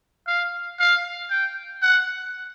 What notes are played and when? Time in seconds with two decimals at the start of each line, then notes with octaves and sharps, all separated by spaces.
0.27 F5
0.80 F5
1.31 G5
1.82 F#5